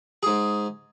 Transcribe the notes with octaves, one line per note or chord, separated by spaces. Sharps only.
G#2 G#4